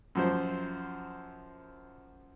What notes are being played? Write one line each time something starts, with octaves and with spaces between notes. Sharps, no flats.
F#2 F3 C5